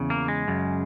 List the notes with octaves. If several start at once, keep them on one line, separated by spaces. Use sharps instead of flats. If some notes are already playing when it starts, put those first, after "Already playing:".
Already playing: E2 C#3
A#3
G#3
F#2 C#3